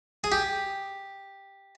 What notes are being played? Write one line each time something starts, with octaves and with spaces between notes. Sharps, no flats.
G#4
G4